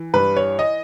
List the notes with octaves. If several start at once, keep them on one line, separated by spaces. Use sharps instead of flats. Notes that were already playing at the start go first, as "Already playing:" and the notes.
Already playing: E3
G2 B4
C#5
D#5